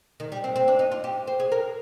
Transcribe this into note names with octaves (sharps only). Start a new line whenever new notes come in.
D#3
G3
C4
C4
D4
D#4
F4
G4
C5
G#4
A#4